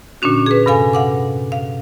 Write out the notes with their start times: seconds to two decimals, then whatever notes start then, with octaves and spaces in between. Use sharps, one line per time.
0.22 A#2 D3 C#4 D4 F#4
0.46 G#4 B4
0.66 G2 C3 A4 F5 G#5
0.93 F5 F#5 D6
1.52 F5